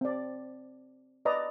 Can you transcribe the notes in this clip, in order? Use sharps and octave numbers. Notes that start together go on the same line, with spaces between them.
C4 D5
B4 D5 D#5 A#5